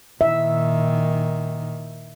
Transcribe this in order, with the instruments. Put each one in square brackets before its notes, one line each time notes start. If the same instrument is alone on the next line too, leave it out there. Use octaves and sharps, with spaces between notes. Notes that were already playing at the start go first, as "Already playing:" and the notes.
[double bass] A#2 D#3 [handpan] E5